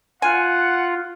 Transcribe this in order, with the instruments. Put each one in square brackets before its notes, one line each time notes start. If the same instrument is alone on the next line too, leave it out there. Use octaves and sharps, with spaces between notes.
[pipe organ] F4 [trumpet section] F#5 [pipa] G#5